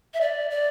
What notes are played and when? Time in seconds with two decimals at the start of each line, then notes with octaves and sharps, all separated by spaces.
0.14 E5
0.21 D5
0.50 D5